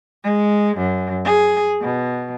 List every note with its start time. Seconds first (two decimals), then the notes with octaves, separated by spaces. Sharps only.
0.24 G#3
0.77 F#2
1.25 G#4
1.81 B2